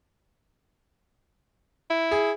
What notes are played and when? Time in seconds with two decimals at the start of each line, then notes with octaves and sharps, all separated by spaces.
1.90 E4
2.11 G#4